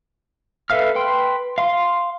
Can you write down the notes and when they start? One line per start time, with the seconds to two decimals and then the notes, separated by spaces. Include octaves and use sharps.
0.70 A4 B4 E5 F5 F6
0.96 B4 G5 C6
1.58 F5 C6